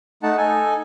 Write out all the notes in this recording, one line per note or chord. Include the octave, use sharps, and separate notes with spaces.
A3 D#4 F#5 A5
D#4 A4 G#5